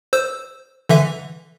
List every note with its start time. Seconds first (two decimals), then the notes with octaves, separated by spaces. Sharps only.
0.13 C5 E6
0.89 D3 E3 E5